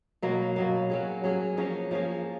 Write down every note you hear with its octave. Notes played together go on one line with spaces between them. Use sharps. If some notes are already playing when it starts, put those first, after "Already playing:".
B2 F#3 A#3
B2 F#3 A#3
F#3 C#4 G#4
F#3 C#4 G#4
F3 A#3 C#4 G#4
F3 A#3 C#4 G#4